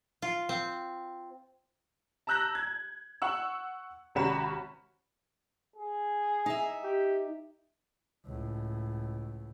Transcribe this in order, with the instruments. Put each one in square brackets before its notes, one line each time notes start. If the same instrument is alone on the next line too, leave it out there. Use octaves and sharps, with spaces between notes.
[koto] F4
C4
[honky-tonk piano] A5 A#5 E6 F#6 G6 A#6
G#6
F#5 C#6 E6
G#1 C3 C#4 F#4 B5 E7
[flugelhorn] G#4
[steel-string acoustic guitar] D#4 E5
[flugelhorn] G4
[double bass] C#2 A2